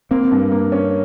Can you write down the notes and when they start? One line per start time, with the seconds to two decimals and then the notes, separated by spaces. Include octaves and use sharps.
0.11 A#3 C4
0.31 G2
0.52 A#3
0.72 C#4